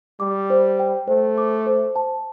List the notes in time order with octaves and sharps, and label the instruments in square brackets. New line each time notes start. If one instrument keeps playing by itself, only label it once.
[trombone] G3 [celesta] D6
[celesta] C5
G5
[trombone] A3 [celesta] C5
[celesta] D6
C5
A5